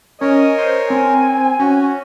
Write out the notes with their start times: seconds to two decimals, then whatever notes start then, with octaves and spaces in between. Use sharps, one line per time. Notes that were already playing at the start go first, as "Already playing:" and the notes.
0.21 C#4 A#4 C#5 D#5
0.58 C5
0.90 C4 G#5
1.60 C#4 F#4